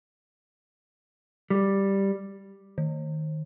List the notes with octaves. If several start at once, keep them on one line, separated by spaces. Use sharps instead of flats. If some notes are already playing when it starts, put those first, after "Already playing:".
G3
D#3